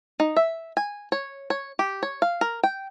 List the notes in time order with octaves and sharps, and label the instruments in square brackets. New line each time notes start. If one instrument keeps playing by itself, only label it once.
[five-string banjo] D#4
E5
G#5
C#5
C#5
G4
C#5
F5
A#4
G5